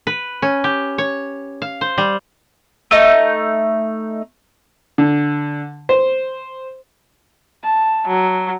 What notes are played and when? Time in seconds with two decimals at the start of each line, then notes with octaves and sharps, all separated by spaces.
0.07 B4
0.42 C#4
0.64 G4
0.98 C#5
1.62 F5
1.81 C5
1.98 G3
2.91 A3 D#4
4.98 D3
5.89 C5
7.63 A5
8.08 F#3